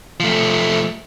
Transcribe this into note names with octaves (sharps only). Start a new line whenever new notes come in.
F3 A3